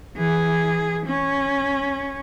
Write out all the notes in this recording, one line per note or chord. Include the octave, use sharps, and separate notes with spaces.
E3 G#4
C#4